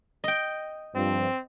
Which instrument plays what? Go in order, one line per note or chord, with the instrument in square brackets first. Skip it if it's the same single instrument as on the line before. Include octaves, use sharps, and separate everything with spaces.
[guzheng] D#5 G5
[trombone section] G2 F3 [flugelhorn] C4